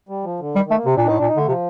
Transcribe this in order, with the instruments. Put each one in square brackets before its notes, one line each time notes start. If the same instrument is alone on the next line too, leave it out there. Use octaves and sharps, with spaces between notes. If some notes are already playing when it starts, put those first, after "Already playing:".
[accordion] G3
F3
D3
[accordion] D#3 [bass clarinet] G3
[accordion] D#3
[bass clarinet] A3
[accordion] A#3
[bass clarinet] C3 [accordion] C4
[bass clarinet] A#2 [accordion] D4
[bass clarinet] A2 [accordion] D#4
[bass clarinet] A#2 [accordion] D4
[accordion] D#4
[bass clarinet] D3 [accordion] A3
[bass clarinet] C3 [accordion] F3